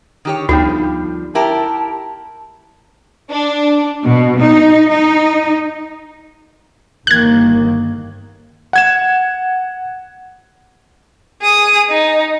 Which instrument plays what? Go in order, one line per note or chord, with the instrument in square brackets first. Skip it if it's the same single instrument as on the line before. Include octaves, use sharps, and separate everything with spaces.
[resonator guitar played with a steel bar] D#3 G4 C#5
[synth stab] D2 [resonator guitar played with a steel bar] F3 G3 [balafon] B3 D#4
[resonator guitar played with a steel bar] E4 G4 A#4 [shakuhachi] A5
[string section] D4
B2
D#4
D#4
[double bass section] G1 D#3 A#3 [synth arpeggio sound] F#6 G#6
[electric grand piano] F#5 G#6 E7
[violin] G#4 D#6
D#4